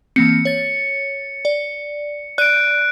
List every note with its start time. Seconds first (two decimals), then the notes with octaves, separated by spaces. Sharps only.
0.16 E3 A#3 C4 C#7
0.45 C#5 A6
1.45 D5
2.38 D5 F#6 G6 D7 D#7